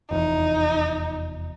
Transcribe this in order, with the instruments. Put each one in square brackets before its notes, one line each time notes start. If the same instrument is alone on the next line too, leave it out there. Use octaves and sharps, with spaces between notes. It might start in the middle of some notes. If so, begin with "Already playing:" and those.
[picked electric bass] F1 E2 [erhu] D#4